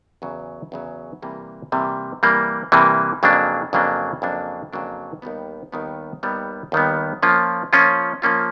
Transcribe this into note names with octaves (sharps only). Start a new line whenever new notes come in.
E2 C#3 F#3
E2 C#3 F#3
C3 E3 G3 A#3
C3 E3 G3 A#3
C3 E3 G3 A#3
C3 E3 G3 A#3
F2 C#3 F#3 A#3 D4
F2 C#3 F#3 A#3 D4
F2 C#3 F#3 A#3 D4
F2 C#3 F#3 A#3 D4
D#2 D#3 G3 B3
D#2 D#3 G3 B3
D#2 D#3 G3 B3
D#2 D#3 G3 B3
F3 A#3 C#4 F4
F3 A#3 C#4 F4
F3 A#3 C#4 F4